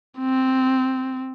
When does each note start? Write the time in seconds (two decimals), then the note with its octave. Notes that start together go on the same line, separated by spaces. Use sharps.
0.19 C4